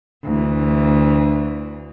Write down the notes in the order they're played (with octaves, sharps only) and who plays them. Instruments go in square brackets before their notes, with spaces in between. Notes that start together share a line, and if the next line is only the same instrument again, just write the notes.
[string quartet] D2 E3